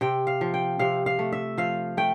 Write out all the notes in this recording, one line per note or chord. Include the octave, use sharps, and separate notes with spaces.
C3 G5
F5
F3
G5
C3 F5
F5
A3
E5
F3 F5
A3 G5